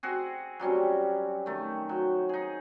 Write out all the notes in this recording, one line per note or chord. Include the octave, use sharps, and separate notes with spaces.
C4 F#4 G#4
F#3 G3 C4 C#4
D#3 A3
F#3
D#4 G#4